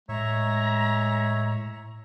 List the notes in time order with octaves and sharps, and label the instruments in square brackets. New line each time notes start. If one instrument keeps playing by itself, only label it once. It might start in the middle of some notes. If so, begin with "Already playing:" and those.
[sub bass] A2 [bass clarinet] G#3 [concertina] C#5 E5 [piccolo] A#5